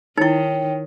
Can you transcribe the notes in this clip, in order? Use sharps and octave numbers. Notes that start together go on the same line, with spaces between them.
D#3 D#4 E4 C#5 G5